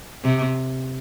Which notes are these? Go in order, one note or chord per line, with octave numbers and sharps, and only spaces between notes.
C3